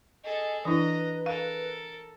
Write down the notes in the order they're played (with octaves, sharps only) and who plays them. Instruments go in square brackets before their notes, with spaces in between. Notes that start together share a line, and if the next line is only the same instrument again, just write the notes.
[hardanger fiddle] G#4 A4 [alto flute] D#5
[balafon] E3 D4 E4 [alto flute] B4 [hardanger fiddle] D#5 A#5
[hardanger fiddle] A4 A#4 [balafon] F5